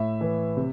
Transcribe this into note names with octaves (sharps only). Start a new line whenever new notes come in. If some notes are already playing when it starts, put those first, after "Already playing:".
Already playing: A2 E5
E3
C3